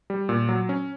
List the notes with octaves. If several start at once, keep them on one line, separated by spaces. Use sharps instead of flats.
G3
A#2
F#3
C#4